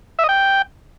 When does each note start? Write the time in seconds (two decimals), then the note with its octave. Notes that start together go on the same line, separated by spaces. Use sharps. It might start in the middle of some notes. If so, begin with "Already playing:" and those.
0.19 E5
0.24 D#5
0.29 G5